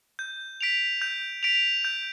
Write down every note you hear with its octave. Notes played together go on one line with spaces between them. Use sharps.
G6
B6 D7 F7
G6
B6 D7 F7
G6